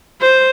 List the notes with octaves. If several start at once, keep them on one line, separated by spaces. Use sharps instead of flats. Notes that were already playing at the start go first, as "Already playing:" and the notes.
C5